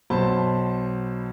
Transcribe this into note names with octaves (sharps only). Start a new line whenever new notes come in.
B1 B2 C5 A5 B5